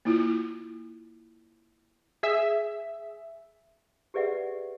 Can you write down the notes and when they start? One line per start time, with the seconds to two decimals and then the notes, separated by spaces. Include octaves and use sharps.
0.05 A#3 E4 F4
2.23 G#4 E5
4.14 G4 G#4 B4 D5 E5 F#5